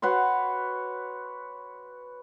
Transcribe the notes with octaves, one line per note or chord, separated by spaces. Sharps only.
F#4 B4 C#5 C6